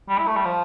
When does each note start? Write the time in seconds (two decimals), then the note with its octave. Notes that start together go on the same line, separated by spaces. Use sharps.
0.09 G3
0.18 E4
0.27 A3
0.36 G3
0.45 F3